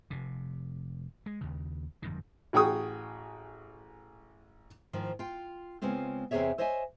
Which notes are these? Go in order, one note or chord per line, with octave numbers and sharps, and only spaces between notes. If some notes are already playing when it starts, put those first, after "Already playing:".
F1 C3
G#3
D#2 C#3
G1 F2 G#2 D#3
A1 F#4 G#4 G5 C#6 D#6
G#2 D#3 F3
F4 G5
C#3 G#3 B3 C4 F4
E2 C3 C4 G#4 C#5 E5
C5 C#5 D#5 E5 G5 G#5